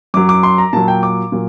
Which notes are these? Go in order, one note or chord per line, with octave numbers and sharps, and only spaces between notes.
F#2 F#3 D6
D6
C6
A#5
A#2 F#3 A5
G5
D6
A#2 F#3